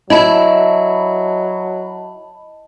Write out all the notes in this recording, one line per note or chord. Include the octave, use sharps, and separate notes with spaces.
F#3 E4 D#5 A5 B5